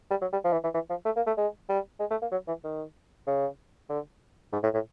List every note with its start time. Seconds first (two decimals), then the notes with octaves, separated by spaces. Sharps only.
0.10 G3
0.21 F#3
0.33 G3
0.44 F3
0.53 E3
0.64 E3
0.74 E3
0.90 F3
1.05 A3
1.17 A#3
1.27 A3
1.38 G#3
1.69 G3
2.00 G#3
2.11 A3
2.22 A#3
2.32 F#3
2.48 E3
2.64 D#3
3.27 C#3
3.90 D3
4.53 G#2
4.64 A2
4.74 A2